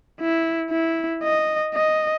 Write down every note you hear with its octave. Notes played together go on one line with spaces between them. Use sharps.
E4
E4
D#5
D#5